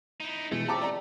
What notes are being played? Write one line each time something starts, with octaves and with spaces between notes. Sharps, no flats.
D#4 E4
B2 E3 G#3 A3
G4 A5 A#5 D6
D5 A#5